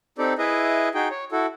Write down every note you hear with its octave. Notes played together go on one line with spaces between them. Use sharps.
C4 D#4 G4 A4 D5
E4 G#4 B4 D#5 E5
D#4 F#4 G#4 G5
C#5
E4 F#4 A4